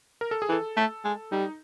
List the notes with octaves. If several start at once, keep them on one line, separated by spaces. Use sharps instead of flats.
A#4
A4
G#4
E3 A4
A3
G#3
G3 D#4